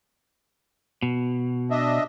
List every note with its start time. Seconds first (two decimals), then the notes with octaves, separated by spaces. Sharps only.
1.02 B2
1.71 D4 D#5 E5